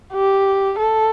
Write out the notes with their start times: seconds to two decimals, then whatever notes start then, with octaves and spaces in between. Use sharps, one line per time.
0.13 G4
0.79 A4